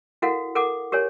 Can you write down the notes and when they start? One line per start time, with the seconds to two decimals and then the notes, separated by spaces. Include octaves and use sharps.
0.22 E4 F#4 A4 A#4 F5 F#5
0.55 A4 A#4 F#5 D6
0.92 G4 A#4 C#5 G#5